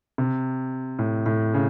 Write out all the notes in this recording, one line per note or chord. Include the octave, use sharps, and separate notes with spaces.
C3
A2
A2
C#3